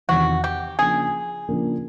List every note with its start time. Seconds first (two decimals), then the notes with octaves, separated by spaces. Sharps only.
0.08 E2 C3 D#3 F#4
0.44 G4
0.78 C#3 F3 A#3 D4 G#4
1.49 C#3 F3 A#3 D4